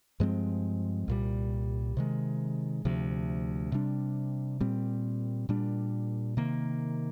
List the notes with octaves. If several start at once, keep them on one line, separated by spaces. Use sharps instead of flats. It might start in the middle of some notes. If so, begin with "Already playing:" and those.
G2 F3 G#3 C4
C2 A#2 G3
C3 D#3 G#3
D2 C3 F3
C3 G3 D4
A#2 G3 C4
A#2 G3 D4
C3 D#3 A#3